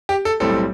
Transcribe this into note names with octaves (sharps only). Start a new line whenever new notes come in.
G4
A4
B1 A2 G3 C4 A4